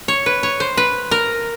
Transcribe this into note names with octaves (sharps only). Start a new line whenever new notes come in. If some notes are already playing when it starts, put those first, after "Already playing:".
C#5
B4
C#5
C5
B4
A#4